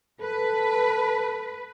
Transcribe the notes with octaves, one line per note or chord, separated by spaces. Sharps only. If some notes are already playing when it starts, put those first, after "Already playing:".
A4 B4